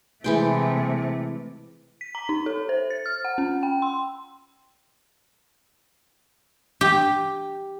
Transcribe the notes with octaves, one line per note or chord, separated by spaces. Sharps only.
C3 E3 G#3 A3 G5
B6
A#5
D#4
A4
C5
A6
F6
F#5
C#4
G5
C6
G4